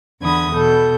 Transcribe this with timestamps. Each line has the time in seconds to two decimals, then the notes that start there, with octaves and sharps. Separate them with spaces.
0.21 E2 D3 B5 D#6 G#6
0.55 B2 A4 G6